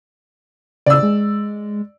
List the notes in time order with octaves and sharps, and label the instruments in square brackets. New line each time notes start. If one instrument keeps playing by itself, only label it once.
[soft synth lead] C#3 [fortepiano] D5 E6
[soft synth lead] G#3